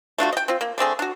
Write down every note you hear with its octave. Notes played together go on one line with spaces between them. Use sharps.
A3 D4 F4 F#4
D#5 G5
C4 F4
A#3
D3 A3 C4 G#4
D4 F#4